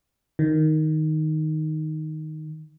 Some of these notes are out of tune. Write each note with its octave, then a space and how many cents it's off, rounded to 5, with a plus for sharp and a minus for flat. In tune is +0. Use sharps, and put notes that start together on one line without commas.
D#3 +0